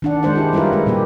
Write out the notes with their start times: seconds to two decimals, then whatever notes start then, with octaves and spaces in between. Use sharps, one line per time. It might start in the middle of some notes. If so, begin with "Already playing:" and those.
0.02 D#3 D4 F#5
0.23 G#3 D4 C5 F#5
0.35 E4 G4
0.53 G3 E4 F4 A#4 B4
0.73 G#3
0.86 A#2 G3 A#3 G4